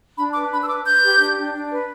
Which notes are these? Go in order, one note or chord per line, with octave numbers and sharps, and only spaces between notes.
D4 B5
B4 D6
D4 B5
E6
B4 D6
B4 G6
G4
D4
D4
D4
B4